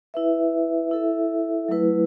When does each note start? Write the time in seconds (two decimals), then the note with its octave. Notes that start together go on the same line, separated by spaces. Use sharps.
0.14 E4 B4 E5
0.91 E4 A4 E5
1.68 F#3 A3 E4 B4